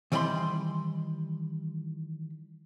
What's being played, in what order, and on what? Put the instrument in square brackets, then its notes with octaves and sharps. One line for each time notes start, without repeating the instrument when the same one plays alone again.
[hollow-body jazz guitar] D#3 E3 G3 G#5 B5 C6